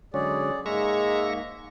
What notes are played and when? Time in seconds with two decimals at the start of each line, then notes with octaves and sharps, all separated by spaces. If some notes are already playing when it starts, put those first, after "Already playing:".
0.14 D3 F#3 G#3 C#4 G#4 D5
0.66 G#2 G#3 A#3 E5 A#5 C#6